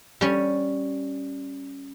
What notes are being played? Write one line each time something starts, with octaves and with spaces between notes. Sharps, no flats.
G3 C#4